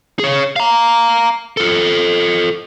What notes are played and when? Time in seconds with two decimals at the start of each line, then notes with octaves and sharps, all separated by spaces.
0.19 G#4 C#5
0.56 F5 A#5
1.57 F4 A4